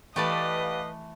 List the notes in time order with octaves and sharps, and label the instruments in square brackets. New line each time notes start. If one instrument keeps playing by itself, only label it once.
[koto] E3 A3 [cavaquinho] G4 D5 A5 [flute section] B4 F5 [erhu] D#5